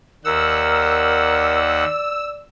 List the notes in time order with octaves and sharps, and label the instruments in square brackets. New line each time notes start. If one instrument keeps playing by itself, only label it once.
[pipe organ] D#2 F#5 [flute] A#4 [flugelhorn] D5 [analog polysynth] E6